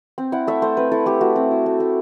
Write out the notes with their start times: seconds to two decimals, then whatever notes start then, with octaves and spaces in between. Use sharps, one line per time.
0.18 C4
0.32 E4 F#5
0.47 A3 E5
0.62 A3 C5
0.77 C4 B4
0.92 E4 A4
1.06 A3 G4
1.21 A3 F#4
1.36 C4
1.51 E4
1.66 A3
1.80 A3